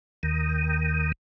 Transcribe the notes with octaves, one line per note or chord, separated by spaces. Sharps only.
D#2 D#3